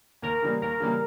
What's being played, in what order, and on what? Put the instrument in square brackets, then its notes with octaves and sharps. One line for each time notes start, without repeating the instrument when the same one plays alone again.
[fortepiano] D#2 [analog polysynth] A#4
[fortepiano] C#3 E3 G3 A#3
[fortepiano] D#2 [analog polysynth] A#4
[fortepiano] C#3 E3 G3 A#3